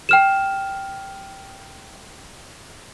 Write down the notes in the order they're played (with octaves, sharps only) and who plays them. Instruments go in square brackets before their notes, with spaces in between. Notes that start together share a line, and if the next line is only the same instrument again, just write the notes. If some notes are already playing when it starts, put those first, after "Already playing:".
[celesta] G5 F6 E7